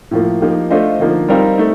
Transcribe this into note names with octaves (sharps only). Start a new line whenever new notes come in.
A2 F3 A#3
F3 A#3 D#4 G4
A3 D4 F4 C5 D#5
D3 F3 A#3 D#4
G3 C4 D#4 A#4 F5
A3 D#4